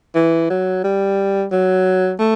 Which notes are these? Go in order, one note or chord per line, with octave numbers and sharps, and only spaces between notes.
E3
F#3
G3
F#3
A3